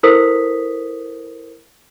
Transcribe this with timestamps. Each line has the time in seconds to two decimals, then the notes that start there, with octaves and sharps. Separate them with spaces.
0.03 E4 A4 A#4 C5 D#6 B6